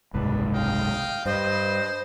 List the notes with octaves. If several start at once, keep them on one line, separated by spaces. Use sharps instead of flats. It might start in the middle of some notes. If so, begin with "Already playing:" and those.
F#1 C2 G#2 D4 B4
D#5 F5 G5
G2 B4 C5 D#5